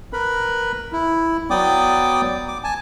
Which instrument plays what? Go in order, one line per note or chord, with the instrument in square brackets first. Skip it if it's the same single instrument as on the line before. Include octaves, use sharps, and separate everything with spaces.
[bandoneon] A#4 B4 B5
E4
F#3 B3 D5 G5 D6 D#6
D6
G#5 A5